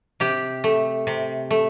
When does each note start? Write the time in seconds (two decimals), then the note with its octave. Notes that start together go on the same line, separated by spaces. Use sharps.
0.20 C3 G4
0.64 A3
1.07 C3
1.51 A3